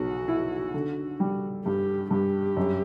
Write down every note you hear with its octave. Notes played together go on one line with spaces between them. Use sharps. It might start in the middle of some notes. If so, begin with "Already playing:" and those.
Already playing: B1 F#4
E4
D3
G3
G2 G4
G2 G4
F#2